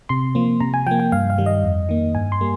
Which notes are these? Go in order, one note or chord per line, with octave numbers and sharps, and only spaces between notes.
C3 C6
F3 A#3
C3 A#5
G#5
F3 A#3 G5
G5
G2 F5
F5
D#3 G3
D#5
F2
D#3 A#3
G2 G#5
C6
G3 A#3